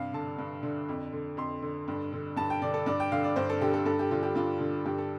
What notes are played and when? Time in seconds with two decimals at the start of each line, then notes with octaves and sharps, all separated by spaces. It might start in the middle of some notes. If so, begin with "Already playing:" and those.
Already playing: G2 C3 F5
0.13 D3 A5
0.38 G2
0.63 D3
0.89 F2
1.13 D3
1.37 F2 C6
1.62 D3
1.88 G2
2.13 D3
2.37 G2 A5
2.50 G5
2.62 D3 D5
2.74 A4
2.86 G2 D5
3.00 G5
3.12 D3 F5
3.24 D5
3.36 G2 C5
3.50 A4
3.61 D3 G4
3.73 A4
3.86 G2 A4
3.99 G4
4.11 D3 F4
4.23 G4
4.35 G2 F4
4.60 D3
4.86 G2 G4
4.98 A4